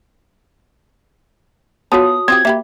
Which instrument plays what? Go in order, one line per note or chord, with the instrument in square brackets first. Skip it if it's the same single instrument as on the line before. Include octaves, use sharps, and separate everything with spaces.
[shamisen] B3 F4 [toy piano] F#4 C#5 A5 [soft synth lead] D#6
[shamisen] C4 F4 G4 [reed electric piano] G#6
[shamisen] A#3 G4 B5 [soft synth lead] E5